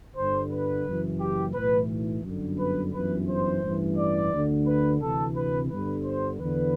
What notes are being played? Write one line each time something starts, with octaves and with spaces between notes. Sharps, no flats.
G1 G2 D3 C5
B4
F#1 F#2 E3
G4
B1 A2 E3 B4
G1 F#2 D3
B4
G1 F#2 E3 B4
C5
A1 G2 E3
D5
D2 D3
B4
D2 C3 E3 A4
B4
G1 G2 D3 B4
C5
E2 D3 B4